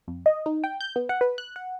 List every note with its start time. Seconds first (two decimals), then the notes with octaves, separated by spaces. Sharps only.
0.08 F2
0.26 D#5
0.46 D#4
0.64 G5
0.81 G6
0.96 B3
1.09 F#5
1.21 B4
1.38 F#6
1.56 F#5